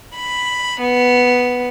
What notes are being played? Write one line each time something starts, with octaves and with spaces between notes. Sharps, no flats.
B5
B3